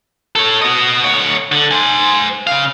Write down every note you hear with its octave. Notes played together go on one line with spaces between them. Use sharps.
A4 C#5
F#4 D#5
D2 C#5
D3
C5 G#5
C#3 F5